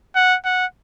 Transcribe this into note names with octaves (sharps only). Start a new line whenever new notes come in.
F#5
F#5